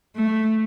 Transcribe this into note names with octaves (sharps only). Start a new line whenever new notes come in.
A3